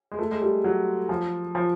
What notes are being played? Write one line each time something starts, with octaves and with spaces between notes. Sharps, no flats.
G#3
A3
G#3
G3
F#3
F3
F3